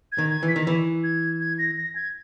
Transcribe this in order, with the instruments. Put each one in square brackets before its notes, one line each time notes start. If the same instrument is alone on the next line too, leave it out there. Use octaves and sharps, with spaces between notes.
[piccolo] G#6
[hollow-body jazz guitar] D#3
[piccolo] G#6
[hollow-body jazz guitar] E3
[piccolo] B6
[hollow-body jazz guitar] D#3
E3
[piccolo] G#6
G#6
A#6
A#6
G#6